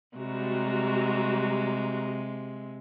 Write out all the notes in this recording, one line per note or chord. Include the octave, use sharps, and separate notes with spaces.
C3 G3 G#3 F#4 A#5